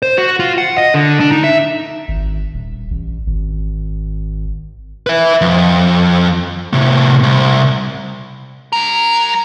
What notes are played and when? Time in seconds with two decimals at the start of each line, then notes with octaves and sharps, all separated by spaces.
0.02 C5
0.18 F#4
0.40 F4
0.58 F#5
0.78 D#5
0.94 D3
1.20 D4
1.32 D#4
1.44 E5
2.08 G#1
2.54 D#1
2.91 A1
3.27 G#1
5.07 B4 E5
5.41 F2
6.73 A2 C3
7.23 C2
8.73 G3 A#4